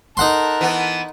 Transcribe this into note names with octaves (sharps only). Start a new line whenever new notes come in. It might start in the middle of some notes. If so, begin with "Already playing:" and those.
D#4 A4 A#4 F#5 C6
E3 B3